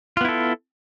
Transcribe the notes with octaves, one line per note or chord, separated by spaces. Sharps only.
B3 E4 F4 A4